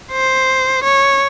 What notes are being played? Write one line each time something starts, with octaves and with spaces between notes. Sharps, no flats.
C5
C#5